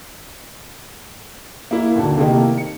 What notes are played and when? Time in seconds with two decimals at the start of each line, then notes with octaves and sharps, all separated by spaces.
1.71 A#3 E4
1.95 D#2 A#2 D3 A#3 F#4 A5
2.17 C3 D#3 A3 A#3 D#4 E4
2.57 C#7